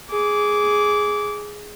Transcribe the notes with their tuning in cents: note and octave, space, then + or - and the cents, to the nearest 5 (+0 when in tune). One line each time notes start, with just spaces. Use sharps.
G#4 +0 D6 -20